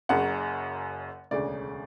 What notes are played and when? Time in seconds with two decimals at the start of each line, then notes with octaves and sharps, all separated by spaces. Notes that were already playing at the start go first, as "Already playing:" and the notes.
0.09 F#1 F#2 C#3 F#5
1.31 E1 D2 C#3 D5